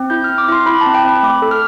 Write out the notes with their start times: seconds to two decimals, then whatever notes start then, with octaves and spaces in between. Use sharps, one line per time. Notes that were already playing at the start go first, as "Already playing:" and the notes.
Already playing: C4
0.10 E4 G6
0.24 F6
0.29 C4
0.38 D6
0.48 E4 C6
0.66 E4 B5
0.81 A5
0.86 C4
0.94 G5
1.05 C4 B5
1.23 A3 D6
1.42 A4
1.51 F6